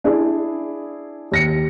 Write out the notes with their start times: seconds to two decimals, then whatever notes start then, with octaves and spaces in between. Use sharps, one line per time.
0.04 D4 E4 G#4
1.32 D#2 A#6 C#7